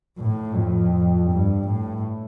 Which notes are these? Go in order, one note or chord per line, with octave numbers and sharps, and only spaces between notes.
A2
F2
G2
A2